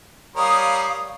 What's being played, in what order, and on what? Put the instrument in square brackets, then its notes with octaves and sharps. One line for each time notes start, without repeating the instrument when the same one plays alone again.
[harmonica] G3 A#4 C#5 [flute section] F5 D#6